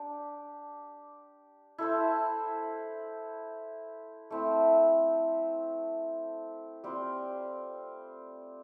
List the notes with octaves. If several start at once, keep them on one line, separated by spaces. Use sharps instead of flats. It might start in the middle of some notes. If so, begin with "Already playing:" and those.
Already playing: D4 G4
E4 A4 C5
A3 C4 E4
G3 C4 F4